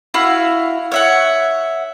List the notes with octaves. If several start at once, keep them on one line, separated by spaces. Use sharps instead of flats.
E4 F#4 F5
C#5 E5 F#5